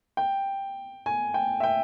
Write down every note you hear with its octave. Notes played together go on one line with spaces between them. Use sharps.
G5
G#5
G5
E5
G5